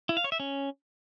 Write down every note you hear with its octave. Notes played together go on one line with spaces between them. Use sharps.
E4
F5
C#5
E5
C#4